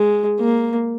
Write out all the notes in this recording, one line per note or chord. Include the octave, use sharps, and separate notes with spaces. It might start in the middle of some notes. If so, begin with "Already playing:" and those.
Already playing: G#3
A#3